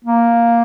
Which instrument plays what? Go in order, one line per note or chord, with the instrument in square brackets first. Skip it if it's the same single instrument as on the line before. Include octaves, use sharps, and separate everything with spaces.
[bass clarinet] A#3